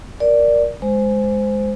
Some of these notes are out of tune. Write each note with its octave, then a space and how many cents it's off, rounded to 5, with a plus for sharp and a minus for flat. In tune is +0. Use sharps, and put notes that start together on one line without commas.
A#4 +10 D5 +0
G#3 +0 C5 -15